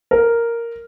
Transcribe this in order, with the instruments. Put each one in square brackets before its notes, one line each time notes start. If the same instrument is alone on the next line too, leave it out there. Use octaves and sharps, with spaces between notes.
[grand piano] A#4